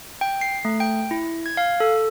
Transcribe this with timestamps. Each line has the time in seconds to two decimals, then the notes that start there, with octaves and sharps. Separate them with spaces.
0.21 G5
0.41 C7
0.65 A3
0.80 G5
1.11 E4
1.46 G#6
1.57 F5
1.80 A4